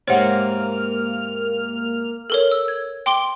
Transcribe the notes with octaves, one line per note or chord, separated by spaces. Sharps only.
G#2 C3 A#3 C4 C#5 F#5 F6
A4 A#4 C#5
E6
G#6
G5 C6 D6 D7 G7